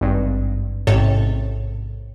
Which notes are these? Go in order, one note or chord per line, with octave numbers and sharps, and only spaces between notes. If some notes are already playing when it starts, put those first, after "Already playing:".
G#1 G2
A1 G#2 C3 A4 C#5 A6